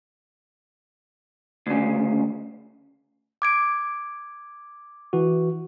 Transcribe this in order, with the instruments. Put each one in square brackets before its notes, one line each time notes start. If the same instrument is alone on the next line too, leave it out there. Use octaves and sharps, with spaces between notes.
[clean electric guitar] D2 C#3
[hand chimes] D6 G#6 D7
[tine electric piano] E3 F#4